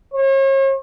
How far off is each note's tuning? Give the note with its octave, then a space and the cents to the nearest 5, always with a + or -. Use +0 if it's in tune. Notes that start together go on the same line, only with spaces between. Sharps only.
C#5 -40